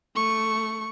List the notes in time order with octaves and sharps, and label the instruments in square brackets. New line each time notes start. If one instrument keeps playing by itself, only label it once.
[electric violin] A3 C#6